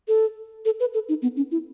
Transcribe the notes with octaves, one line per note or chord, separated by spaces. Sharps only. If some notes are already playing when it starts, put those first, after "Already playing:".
A4
A4
B4
A4
D#4
B3
C#4
E4